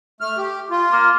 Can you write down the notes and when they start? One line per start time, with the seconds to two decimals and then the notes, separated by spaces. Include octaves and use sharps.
0.21 A3 F6
0.37 G4
0.70 F4
0.92 A#3